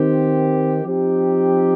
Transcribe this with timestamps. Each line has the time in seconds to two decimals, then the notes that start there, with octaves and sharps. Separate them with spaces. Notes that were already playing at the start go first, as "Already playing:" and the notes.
Already playing: D#3 C4 G4
0.84 F3 C4 D#4 G4